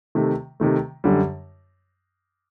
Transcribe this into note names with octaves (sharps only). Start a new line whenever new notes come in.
C3 D#3 A3
C3 D#3 A3
F#2 D3 G3